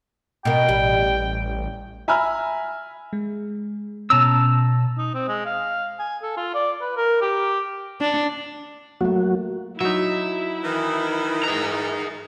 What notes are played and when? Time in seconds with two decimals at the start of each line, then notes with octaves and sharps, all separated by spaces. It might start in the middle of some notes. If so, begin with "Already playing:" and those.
0.45 B2 A#4 G5
0.69 A1 G3
2.08 E5 G#5 A#5 B5 E6 F6
3.13 G#3
4.10 B2 C#4 A5 A#5 E6
4.98 D#4
5.14 C4
5.28 G#3
5.46 F5
5.99 G#5
6.23 A4
6.37 F4
6.55 D5
6.81 B4
6.97 A#4
7.22 G4
8.01 D4
9.01 F#3 A3 A#3 F#4
9.80 F#3 D#4 E4 E5
10.63 D#3 E3
11.43 G#4 A#5